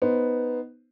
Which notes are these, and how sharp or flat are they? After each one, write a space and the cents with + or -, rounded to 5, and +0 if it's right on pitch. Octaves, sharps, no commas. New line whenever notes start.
B3 +0 D#4 +0 C5 +0